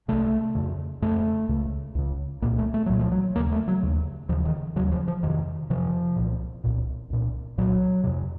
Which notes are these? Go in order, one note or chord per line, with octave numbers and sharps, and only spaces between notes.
C2 C3 A3
F2 C#3
F2 C#3 A3
C#2 C#3
C#2 C#3
C2 A#2 A#3
A3
A3
C2 A#2 F#3
F3
F#3
D#2 C#3 A#3
A3
F#3
D#2 C#3
D#2 C#3 F3
D#3
D#2 C#3 F#3
F3
F3
F2 C3 D#3
F2 C3 F3
C2 A#2
C2 A#2
C2 A#2
C2 A#2 F#3
F2 C3